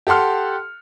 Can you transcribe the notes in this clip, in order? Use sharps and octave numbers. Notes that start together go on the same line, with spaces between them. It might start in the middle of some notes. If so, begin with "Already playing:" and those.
G4 A4 F#5 C6 F6